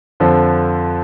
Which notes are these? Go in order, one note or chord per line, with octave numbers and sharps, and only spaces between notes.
F2 D3 F3